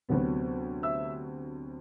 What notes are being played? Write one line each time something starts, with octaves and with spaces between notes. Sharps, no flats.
D2 C3 F#3 B3
E5 E6